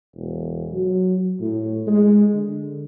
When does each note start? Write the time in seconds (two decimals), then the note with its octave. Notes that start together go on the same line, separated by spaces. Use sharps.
0.15 E1
0.71 F#3
1.40 A2
1.87 G#3
2.34 D3